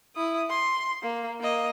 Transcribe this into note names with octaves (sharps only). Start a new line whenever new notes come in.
E4 D#6
C6
A#3
A#3 D#5